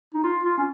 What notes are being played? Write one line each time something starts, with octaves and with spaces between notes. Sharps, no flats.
D#4
F4
F4
C#4